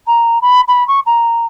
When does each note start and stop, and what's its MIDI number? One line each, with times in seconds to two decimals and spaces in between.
0.06 0.37 82
0.41 0.60 83
0.68 0.86 83
0.87 0.99 85
1.05 1.45 82